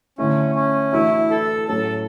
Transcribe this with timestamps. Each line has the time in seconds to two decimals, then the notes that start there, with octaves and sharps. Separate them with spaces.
0.18 D3 A3 C#4 E4
0.55 C#4
0.93 E3 A3 D4 E4 F#4
1.30 A4
1.68 A2 F#3 C#4 A4